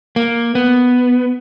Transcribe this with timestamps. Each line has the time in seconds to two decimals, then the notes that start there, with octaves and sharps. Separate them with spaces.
0.16 A#3
0.55 B3